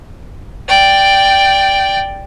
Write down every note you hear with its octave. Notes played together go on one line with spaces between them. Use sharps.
D5 G5